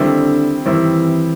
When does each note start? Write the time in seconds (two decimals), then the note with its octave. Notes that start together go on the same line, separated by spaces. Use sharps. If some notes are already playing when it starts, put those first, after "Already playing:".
Already playing: D3 D#3 G3 C4 E4
0.66 D#3 E3 G3 C4 E4